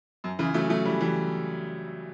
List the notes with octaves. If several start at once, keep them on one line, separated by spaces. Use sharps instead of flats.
F#2
C#3 E3
F#3 A3
F#3 A3
E3 G3
E3 G3